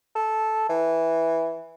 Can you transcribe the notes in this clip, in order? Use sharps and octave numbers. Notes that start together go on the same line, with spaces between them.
A4
E3